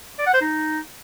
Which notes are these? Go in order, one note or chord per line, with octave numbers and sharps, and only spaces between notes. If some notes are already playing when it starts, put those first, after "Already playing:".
D5
F#5
C5
D#4